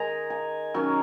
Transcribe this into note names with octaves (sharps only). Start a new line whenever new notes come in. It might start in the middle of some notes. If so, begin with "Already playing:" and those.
Already playing: D#3 G#3 D#4 D#5 G#5 A#5
G#5
D#3 F#3 C#4